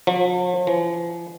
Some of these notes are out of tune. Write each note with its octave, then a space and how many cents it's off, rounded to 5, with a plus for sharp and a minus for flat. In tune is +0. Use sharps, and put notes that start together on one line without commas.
F3 +45
F3 -45